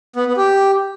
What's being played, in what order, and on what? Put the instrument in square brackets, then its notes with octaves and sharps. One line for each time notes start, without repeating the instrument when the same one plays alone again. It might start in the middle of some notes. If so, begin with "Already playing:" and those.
[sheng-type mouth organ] B3
B3
G4